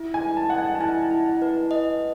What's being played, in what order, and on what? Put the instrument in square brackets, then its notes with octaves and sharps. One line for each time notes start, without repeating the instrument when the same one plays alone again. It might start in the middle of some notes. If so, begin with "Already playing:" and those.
Already playing: [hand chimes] E4
[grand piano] G#5
[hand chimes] B4
[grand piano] A5
[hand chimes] D#5 [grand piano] F#5
[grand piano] G#5
A5
[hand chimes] E4 [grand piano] G#5
[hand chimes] E4
B4
D#5